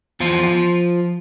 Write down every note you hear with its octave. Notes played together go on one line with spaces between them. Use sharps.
E2 F3 F4